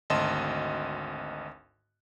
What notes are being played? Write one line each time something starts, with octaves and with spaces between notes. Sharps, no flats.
G#1 D2 D#5 A5 C6 E7